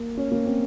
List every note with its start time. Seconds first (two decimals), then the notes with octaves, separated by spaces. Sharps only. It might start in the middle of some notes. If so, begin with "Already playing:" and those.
Already playing: A#3
0.17 C#4
0.31 A#3
0.46 C4